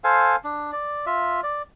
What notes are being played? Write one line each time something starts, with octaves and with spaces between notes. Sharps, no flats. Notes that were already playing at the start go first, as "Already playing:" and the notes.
A4 C5 F5 G#5
D4
D5
F4 E5
D5